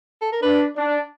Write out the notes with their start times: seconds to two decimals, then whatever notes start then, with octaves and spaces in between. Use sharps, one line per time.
0.21 A4
0.32 A#4
0.42 D4 B4
0.77 D4